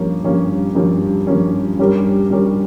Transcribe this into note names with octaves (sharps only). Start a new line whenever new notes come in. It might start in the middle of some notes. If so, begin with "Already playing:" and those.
Already playing: G2 F3 A#3 C#4
G2 F3 A#3 C#4
G2 F3 A#3 C#4
G2 F3 A#3 C#4
G2 G3 C#4 G4 A#4
G2 G3 C#4 G4 A#4